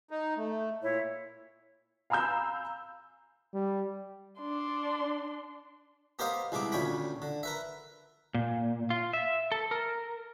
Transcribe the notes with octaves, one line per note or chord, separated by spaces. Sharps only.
D#4
A3
A#2 E4 C#5
F5 G#5 A#5 B5 E6 G6
G3
D4 C6
B3 G4 A#4 C5 D#5 F5
C2 G#3 B3 E4 D6
D2 A#2 C#4 C#5 G5 B5
D3
A#4 B4 E5
A#2
F4
E5
A4
A#4